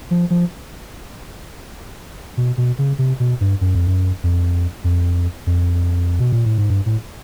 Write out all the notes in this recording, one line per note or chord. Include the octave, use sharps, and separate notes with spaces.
F3
F3
B2
B2
C#3
C3
B2
G2
F#2
F2
F#2
F2
F2
F2
B2
A#2
A2
G#2
G2
A2